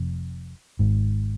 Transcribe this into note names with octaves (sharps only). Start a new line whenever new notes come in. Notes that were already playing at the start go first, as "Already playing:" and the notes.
Already playing: F1 F2 C3
G#1 G#2